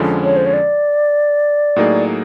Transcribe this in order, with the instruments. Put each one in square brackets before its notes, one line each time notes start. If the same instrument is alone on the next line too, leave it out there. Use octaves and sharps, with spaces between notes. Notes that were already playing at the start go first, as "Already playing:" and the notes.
Already playing: [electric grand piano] F2 D3 F3 G#3 C#4
[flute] C#5
C5
C#5
D5
[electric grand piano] A2 F#3 A#3 D#4 G#4